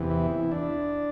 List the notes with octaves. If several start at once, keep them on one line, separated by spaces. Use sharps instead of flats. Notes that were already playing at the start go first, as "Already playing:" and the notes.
Already playing: E2 C3 E3
E4
D4